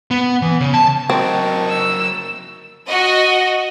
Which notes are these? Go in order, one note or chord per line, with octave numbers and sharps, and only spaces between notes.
B3
E3
C#3
A5
F#3 A#3 C4 D#4 A5 C#6
E6
F#4 D#5